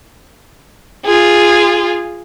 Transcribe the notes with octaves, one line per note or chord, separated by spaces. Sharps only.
F4 G#4